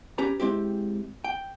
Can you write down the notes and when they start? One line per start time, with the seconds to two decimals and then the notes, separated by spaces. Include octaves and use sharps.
0.18 C#4 G4 B4 A#5
0.40 G#3 C4 E4 G4
1.24 G5